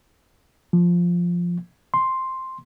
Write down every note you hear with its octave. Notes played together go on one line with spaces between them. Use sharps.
F3
C6